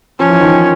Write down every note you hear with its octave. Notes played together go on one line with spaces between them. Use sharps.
F3 C#4
E3
D#3 F3